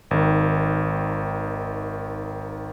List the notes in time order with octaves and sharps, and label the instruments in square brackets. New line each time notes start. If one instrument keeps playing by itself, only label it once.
[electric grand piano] G#1 D#3